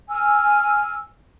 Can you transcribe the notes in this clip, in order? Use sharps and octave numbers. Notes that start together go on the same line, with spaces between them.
G#5 E6 F6